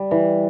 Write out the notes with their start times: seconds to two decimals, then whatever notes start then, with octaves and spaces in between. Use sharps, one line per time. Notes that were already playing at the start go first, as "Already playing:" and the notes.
Already playing: G3
0.11 E3